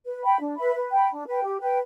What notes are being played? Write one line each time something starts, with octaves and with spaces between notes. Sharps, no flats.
B4
G5 B5
D4
B4 E5 B5
B4
G5 B5
D4
B4 G5
G4
B4 G5